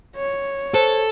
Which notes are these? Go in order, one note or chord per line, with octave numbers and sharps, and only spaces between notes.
C#5
A4 C5